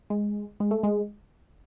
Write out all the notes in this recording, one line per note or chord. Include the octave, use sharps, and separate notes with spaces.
G#3
G#3
A3
G#3